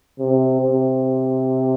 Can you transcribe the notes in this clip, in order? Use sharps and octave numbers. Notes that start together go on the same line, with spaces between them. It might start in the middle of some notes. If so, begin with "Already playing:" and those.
C3
C3